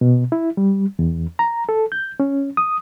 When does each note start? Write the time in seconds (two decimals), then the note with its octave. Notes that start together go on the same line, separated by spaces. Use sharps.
0.01 B2
0.32 E4
0.57 G3
0.99 E2
1.39 A#5
1.69 A4
1.92 G6
2.20 C#4
2.57 D#6